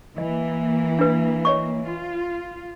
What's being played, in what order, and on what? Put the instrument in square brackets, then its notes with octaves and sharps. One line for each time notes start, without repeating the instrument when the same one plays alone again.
[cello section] E3 A#3 [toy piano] D#5
[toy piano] D4 B4
C#5 D#5 C#6
[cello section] F4